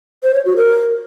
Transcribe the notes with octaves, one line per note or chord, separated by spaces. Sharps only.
C5
C#5
F#4
A#4